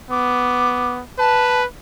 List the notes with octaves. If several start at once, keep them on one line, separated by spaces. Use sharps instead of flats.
B3 D6
B4 A5